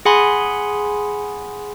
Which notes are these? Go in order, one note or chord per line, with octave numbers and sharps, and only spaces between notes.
G#4 F#5 G#5 B5 C6